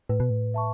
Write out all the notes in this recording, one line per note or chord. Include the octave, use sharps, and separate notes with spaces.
A2 B4
B2
A2
E5 A5 C#6